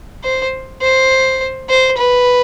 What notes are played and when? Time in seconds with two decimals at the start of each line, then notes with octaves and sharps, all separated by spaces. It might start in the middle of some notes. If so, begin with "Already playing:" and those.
0.24 C5
0.81 C5
1.69 C5
1.98 B4